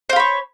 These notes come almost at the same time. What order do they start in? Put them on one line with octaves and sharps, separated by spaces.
C5 F5 B5 C#5